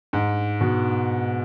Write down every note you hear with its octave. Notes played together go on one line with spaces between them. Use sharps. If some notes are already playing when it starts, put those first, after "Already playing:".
G#2
B2